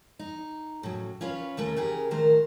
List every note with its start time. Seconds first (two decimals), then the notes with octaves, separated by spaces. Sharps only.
0.19 D#4
0.83 A2 C#3 F#3
1.21 C#4 F4 B4 C#5
1.57 D#2 C#3 A3 A#4
1.76 C#3 G4 G#4 A#4
2.11 A2 D#3 A3 A#4 C5